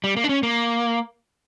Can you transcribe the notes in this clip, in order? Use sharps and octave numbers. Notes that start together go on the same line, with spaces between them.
G3
A#3
D4
C#4
A#3